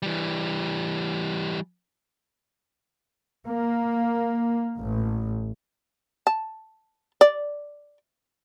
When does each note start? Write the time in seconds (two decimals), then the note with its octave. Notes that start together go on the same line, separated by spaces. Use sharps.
0.02 E3 G3
3.46 A#3
4.78 A1
6.27 A5
7.21 D5